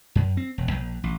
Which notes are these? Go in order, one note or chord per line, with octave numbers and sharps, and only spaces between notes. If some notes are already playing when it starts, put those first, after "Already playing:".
F#2
C4
E1
A#1
A1